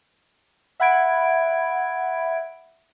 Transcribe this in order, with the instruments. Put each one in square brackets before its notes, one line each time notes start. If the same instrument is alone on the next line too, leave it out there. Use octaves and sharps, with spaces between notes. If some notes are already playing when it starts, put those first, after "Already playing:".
[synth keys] E5 F#5 B5 G#6 D7